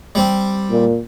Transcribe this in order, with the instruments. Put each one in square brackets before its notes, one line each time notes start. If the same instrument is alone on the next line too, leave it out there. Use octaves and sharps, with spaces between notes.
[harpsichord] G3 C4
[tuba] A#2